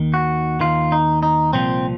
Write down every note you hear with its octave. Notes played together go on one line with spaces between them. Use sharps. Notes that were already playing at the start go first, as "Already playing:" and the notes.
Already playing: D#2 D#3
F#4
D#2 D#3 F4
D#4
D#4
C2 A#2 F3 C4